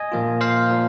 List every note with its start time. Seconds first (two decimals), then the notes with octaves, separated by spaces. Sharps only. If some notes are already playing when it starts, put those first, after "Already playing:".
Already playing: D#5 G#5
0.12 A#2 F3 A#3 F4
0.41 C5 F5
0.70 A#2 F3